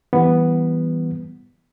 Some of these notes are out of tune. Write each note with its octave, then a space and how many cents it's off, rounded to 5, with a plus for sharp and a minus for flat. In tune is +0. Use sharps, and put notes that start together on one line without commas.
E3 +0 G3 +0 B3 +0